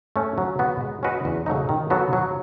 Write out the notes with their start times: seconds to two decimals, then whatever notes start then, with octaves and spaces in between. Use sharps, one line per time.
0.16 A3 C#4
0.38 F#3
0.59 B3 F#4 B4
0.81 G#3
1.03 C#4 F#4 B4 D#5
1.25 E2
1.46 C#3 F#3 A3 D#4
1.69 D#3
1.90 F#3 B3 F#4 A4
2.13 F#3